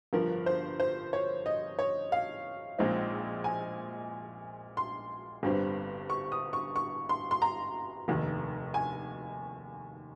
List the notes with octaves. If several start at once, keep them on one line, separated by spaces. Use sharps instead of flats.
G1 G2 F3 A#4
C5
C5
C#5
D#5
C#5
F5
A#1 A#2 G#3 C4 D#4
G#5
C6
G1 G2 G3 C4
C#6
D#6
C#6
C#6
C6
C6
A#5
F1 D#2 D#3
G#5